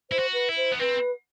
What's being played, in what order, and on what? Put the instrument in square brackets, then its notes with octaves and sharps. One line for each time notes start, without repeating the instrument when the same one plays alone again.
[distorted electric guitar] E4 [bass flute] C5
[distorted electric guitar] F#4
[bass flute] B4
[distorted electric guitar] E4
[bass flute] C5
[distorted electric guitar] B3
[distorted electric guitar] C4 [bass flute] B4